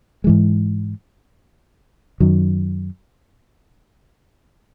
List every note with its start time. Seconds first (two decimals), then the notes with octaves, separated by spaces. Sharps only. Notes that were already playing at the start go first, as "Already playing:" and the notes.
0.24 G#2 E3 G#3
2.20 F#2 D#3 F#3